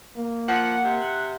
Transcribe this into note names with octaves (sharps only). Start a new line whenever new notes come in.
A#3
F3 F#5
C3